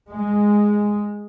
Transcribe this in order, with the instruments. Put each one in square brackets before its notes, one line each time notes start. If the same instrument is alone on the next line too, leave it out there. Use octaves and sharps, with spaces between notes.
[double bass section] G#3